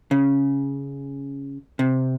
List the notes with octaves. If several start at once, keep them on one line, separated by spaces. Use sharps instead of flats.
C#3
C3